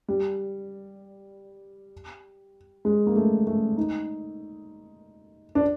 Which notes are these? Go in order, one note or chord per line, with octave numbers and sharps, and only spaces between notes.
G3
G#3
A#3
A3
A3
D#4
D4